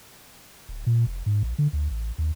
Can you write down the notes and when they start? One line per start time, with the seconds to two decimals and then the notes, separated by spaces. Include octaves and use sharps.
0.69 D1
0.87 A#2
1.06 F1
1.26 G#2
1.43 A#1
1.58 D3
1.73 D2
1.90 A1
2.18 D#2